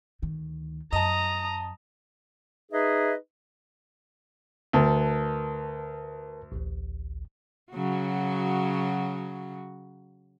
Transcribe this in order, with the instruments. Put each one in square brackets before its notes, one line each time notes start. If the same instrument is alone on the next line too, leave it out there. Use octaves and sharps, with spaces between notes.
[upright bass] D2 D#3
[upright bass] F#2 [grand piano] D#5 A5 [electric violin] A#5 D#6
[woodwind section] D#4 G#4 B4 D#5 E5
[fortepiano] D2 [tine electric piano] A#4 B4 A5
[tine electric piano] A1 D2
[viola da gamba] C#3 F#3 F#4